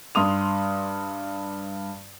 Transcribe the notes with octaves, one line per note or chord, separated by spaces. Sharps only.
G2 C6 D#6 F7